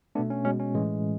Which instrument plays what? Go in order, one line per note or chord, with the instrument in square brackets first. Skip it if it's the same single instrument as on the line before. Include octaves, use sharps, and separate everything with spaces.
[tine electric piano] A3 B3 D4
B2
C#4
B2 G#3 C#4
C#4
A2 E3 G#3